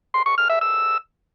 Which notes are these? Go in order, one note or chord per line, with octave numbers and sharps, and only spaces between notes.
C6
C#6
F6
E5
E6